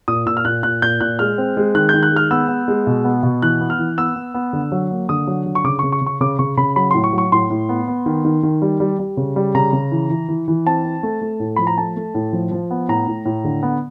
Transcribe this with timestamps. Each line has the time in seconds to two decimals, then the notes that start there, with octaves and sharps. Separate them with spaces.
0.08 A#2 D#6
0.26 A#2 E6
0.37 F6
0.45 A#2 F#6
0.63 A#2 F#6
0.82 A#2 G6
1.01 A#2 F#6
1.19 G#3 F6
1.38 C4
1.57 G#3
1.74 D#3 F#6
1.89 G6
1.94 D#3
2.03 F#6
2.12 G#3 F6
2.31 B3 E6
2.49 B3
2.68 G#3
2.87 B2
3.05 B3
3.23 B2
3.42 E3 F#6
3.61 B3
3.70 F6
3.79 E3
3.98 B3 E6
4.16 B3
4.34 B3
4.53 D3
4.72 F#3
4.91 A#3
5.09 D3 D#6
5.27 F#3
5.46 D3
5.55 C#6
5.64 C#3 D6
5.79 C#3 C#6
5.92 C#6
6.01 C#3
6.06 C#6
6.21 C#3 D6
6.39 C#3 C#6
6.57 C#3 B5
6.76 F#3 B5
6.91 A2 C6
7.04 C#6
7.13 F#3
7.18 C#6
7.32 A2 C6
7.50 A2
7.69 B3
7.88 B3
8.06 D#3
8.25 D#3
8.43 D#3
8.62 G3
8.80 G3
8.99 G3
9.17 C#3
9.36 G3
9.55 C#3 A#5
9.73 C#3
9.92 E3
10.10 E3
10.28 E3
10.48 E3
10.66 C4 A5
10.85 C4
11.03 A3
11.22 A3
11.40 A2
11.56 F3 B5
11.67 A#5
11.77 A3 A5
11.96 A3
12.14 A2
12.33 F3
12.52 F3
12.71 B3
12.89 A2 A#5
13.07 A2
13.25 A2
13.44 D3
13.63 B3